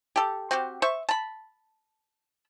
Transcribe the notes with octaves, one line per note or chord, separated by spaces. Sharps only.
G4 A4
C4 F#4 G4
C5 E5 C#6
A5 B5